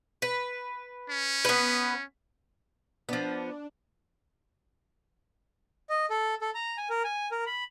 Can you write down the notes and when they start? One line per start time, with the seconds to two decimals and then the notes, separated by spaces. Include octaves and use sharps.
0.22 B4
1.10 C#4
1.45 B3 B4
3.09 F3 B3 D4
5.90 D#5
6.10 A4
6.41 A4
6.55 A#5
6.78 G#5
6.90 A#4
7.04 G#5
7.32 A#4
7.47 B5